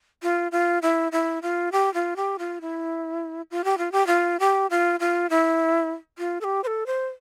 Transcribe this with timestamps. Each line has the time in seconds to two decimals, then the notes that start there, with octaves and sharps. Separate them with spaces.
0.23 F4
0.52 F4
0.82 E4
1.12 E4
1.42 F4
1.72 G4
1.94 F4
2.16 G4
2.39 F4
2.61 E4
3.51 F4
3.64 G4
3.78 F4
3.92 G4
4.07 F4
4.40 G4
4.70 F4
5.00 F4
5.30 E4
6.19 F4
6.41 A4
6.44 G4
6.64 C5
6.67 A4
6.87 C5